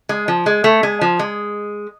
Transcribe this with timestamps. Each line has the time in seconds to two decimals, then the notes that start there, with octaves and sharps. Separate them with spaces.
0.09 G#3
0.28 F3
0.46 G#3
0.64 A3
0.83 G#3
1.01 F3
1.19 G#3